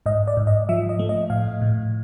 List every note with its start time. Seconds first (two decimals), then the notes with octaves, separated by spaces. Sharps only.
0.06 G#2 D#5
0.27 D5
0.37 G#2
0.47 D#5
0.69 F3 E5
0.89 D#5
0.99 A3
1.09 D#5
1.30 A2 F5
1.62 A2